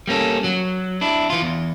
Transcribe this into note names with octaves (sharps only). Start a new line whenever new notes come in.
G3 A#3 C#4 A4
F#3
D4 E4
E3 F4
E2